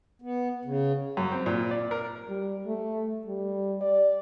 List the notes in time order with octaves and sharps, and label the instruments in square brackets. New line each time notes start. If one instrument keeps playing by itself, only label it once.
[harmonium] B3
C#3
[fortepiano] F#2
C4
A#2
D5
A#4
[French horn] G3
A3
G3
D5